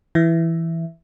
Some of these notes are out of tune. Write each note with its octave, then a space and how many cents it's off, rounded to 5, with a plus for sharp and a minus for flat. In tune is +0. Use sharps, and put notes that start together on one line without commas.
E3 +0 E5 +5